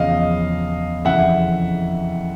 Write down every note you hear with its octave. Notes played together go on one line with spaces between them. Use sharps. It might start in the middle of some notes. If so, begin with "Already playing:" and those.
Already playing: E2 C#3 F3 D#5 F5
F2 C#3 E3 E5 F#5